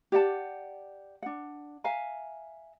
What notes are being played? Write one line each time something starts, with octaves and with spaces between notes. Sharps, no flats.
G4 D5 F#5 A5
D4 F#5
E5 F5 G#5 A#5